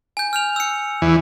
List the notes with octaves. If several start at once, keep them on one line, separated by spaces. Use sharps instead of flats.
G#5 G6
F6 G6 F7
E6 C#7
E2 E3